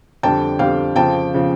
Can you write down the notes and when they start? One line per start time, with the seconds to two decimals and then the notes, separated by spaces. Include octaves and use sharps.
0.23 F2 D3 G3 G5 A5
0.59 F2 D3 G3 F5 G5
0.96 F2 C#3 F3 G5 A5
1.34 C#3 F3